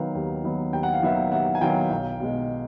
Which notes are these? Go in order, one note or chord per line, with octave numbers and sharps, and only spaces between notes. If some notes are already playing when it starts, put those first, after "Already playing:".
Already playing: D#3 F#3 B3 F5
D#2
D#3 F#3 B3
D#2 G5
F#5
F5
D#3 F#3 B3 E5 F#5
D#2 E5 F#5
G#5
D#3 F#3 B3 F5 G5
B1
B2 G#3